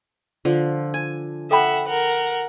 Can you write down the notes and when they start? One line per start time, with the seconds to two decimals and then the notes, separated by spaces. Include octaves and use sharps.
0.45 D3 F3
0.94 G#5
1.51 A4 E5 F#5 G5 B5
1.87 A#4 F#5